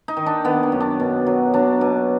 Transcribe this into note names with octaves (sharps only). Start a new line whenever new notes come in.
D#4
D#3
D4
D#3 B3
D4
F#2
D4
B2
F#3
F#3 D4
B2